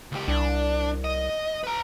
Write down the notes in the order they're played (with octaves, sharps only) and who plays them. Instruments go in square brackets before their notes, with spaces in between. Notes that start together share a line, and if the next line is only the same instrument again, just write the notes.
[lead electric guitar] C#2 G4
[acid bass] C2 [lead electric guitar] D4
[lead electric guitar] D#5
B4 A#5